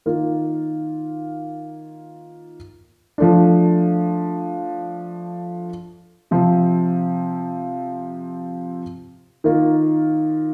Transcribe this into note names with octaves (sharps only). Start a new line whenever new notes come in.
D#3 A#3 F4
F3 A3 D4
C3 F3 C4
D#3 A#3 F4